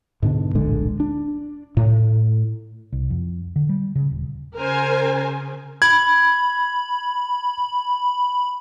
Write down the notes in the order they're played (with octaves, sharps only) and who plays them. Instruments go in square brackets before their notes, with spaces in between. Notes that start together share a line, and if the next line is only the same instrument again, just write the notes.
[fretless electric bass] G#2 B2 D3
D1 A#1 D3 G#3
D4
A2
C2
F2
D3
G3
C#3
D#1
[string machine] C#3 [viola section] A#4 C5 G#5
[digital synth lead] B5 [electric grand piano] G#6